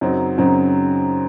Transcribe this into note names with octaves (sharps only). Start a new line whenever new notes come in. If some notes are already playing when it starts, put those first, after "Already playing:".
F#2 C#3 F#3 C4 D#4
F#2 C#3 F#3 C4 D#4